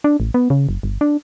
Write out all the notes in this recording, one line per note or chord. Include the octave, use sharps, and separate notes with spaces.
D4
A1
B3
C#3
F#1
G1
D4